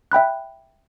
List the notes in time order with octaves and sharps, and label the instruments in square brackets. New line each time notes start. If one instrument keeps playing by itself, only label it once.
[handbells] E5 G5 B5 F#6